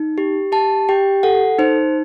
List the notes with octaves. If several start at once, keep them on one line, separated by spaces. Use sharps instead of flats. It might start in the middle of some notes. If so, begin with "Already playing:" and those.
Already playing: D#4
G4
G4 A5
G4 G5
A4 F#5
D#4 C5